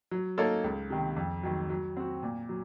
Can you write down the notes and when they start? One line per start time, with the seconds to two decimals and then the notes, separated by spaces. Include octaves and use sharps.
0.11 F#3
0.38 A#3 D#4 A4 C#5
0.64 C#2
0.90 C3 D#3
1.16 F2
1.43 D#3 F#3
1.70 F#3
1.97 C4 F#4
2.23 A#2
2.49 F#3